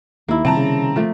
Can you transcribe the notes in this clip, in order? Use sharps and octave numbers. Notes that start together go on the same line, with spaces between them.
D#2 A#3 E4
F2 C3 D#3 G3 C4 A5 A#5
C#3
F3 A3 A#3